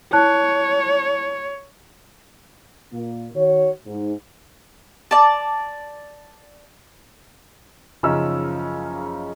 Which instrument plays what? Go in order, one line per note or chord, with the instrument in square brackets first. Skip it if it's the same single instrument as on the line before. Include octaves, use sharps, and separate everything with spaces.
[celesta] E4 A5 F#6 [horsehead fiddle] C#5
[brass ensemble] A#2 A#3
D#3 F#4 C#5
G#2
[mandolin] D5 A5
[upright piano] F#1 C#3 F3 C#4 D#4 E6